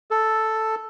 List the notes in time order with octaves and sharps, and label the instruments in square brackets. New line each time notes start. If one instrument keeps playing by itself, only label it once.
[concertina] A4